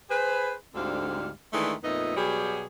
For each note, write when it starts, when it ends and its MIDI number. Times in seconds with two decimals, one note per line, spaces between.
0.10 0.53 68
0.10 0.53 71
0.10 0.53 72
0.74 1.29 38
0.74 1.29 44
0.74 1.29 50
0.74 1.29 55
0.74 1.29 60
0.74 1.29 77
1.53 1.73 51
1.53 1.73 52
1.53 1.73 56
1.53 1.73 57
1.53 1.73 62
1.83 2.13 41
1.83 2.13 46
1.83 2.13 57
1.83 2.13 59
1.83 2.13 63
1.83 2.13 75
2.16 2.67 47
2.16 2.67 54
2.16 2.67 55
2.16 2.67 67
2.16 2.67 68